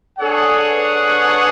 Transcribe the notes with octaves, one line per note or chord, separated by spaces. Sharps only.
D4 G#4 A4 C#5 F#5
B4